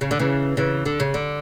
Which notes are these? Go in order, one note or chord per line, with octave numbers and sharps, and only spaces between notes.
C#3
D3
C#3 E3
C#3 E3
D3
C#3
D3